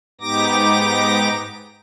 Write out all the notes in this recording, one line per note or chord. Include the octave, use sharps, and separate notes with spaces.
G#2 B3 D#4 G4 D6 A#6